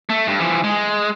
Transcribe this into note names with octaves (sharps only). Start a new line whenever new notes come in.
A3
G2
E3 F3
G#3